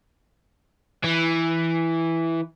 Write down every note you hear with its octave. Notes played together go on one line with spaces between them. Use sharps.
E3